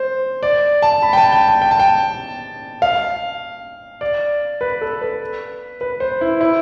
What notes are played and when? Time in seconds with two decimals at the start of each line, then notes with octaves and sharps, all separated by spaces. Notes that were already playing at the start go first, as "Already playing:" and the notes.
Already playing: C5
0.43 D5
0.82 A5
1.02 B5
1.13 G5
1.17 A5
1.32 G5
1.48 A5
1.62 G5
1.71 A5
1.80 G5
2.82 F5
4.01 D5
4.61 B4
4.81 A4
5.01 B4
5.81 B4
6.00 C5
6.21 E4
6.41 E4